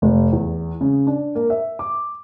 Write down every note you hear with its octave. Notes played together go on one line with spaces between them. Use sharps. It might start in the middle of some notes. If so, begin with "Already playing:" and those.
F1
E2
C#3
D4
A#3
E5
D6